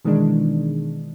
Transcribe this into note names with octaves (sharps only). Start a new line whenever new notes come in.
B2 D#3 E3 G#3 D4